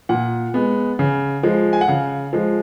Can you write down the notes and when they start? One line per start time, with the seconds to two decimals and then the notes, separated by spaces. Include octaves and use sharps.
0.09 A#2 F#5
0.54 G#3 B3
0.99 C#3
1.43 F3 G#3
1.73 G#5
1.81 F#5
1.88 C#3 F5
2.33 F3 G#3